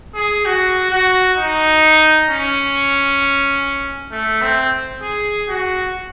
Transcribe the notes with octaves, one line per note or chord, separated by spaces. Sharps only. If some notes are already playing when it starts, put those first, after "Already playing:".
G#4
F#4
F#4
D#4
C#4
A3
C4
G#4
F#4